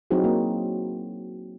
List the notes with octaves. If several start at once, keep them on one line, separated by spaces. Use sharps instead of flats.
F#3 C4 D#4 E4 F#4 G#4
A#3